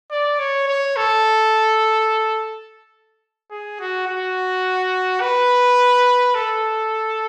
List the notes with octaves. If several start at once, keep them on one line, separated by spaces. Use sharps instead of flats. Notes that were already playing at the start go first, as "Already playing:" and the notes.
D5
C#5
C#5
A4
G#4
F#4
F#4
B4
A4